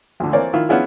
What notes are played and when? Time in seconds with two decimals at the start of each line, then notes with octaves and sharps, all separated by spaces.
0.20 D2 D3
0.33 E3 A#3 C4 C#5 D5
0.54 D#3 E4 F4
0.69 B3 C#4 D4 E4 F4 G#4